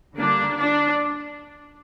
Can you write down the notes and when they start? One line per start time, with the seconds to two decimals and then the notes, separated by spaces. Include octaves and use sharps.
0.17 D3 G3 A#3 D4
0.56 D4